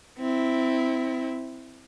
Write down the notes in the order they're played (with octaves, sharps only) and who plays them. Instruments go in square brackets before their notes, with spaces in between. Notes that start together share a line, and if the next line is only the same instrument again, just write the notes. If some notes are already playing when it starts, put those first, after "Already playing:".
[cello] C4 E4